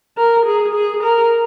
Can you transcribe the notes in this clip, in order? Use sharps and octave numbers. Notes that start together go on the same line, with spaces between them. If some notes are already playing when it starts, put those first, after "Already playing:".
A#4
G#4
G#4
A#4